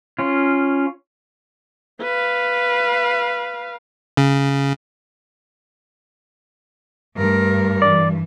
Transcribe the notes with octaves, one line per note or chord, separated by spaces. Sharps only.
C#4 F4
B4 F5
C#3
G2 A3 A#4
E3 D5